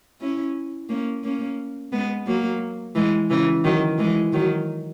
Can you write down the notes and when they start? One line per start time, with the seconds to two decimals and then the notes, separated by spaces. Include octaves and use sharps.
0.21 C#4 E4
0.89 A#3 C#4
1.24 A#3 C#4
1.92 G#3 B3
2.27 F#3 A#3
2.95 E3 G#3
3.30 C#3 E3
3.64 D#3 F#3
3.98 E3 G#3
4.33 D#3 F#3